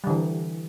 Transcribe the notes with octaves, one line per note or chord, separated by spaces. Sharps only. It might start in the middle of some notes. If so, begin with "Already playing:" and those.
D3 E3 G3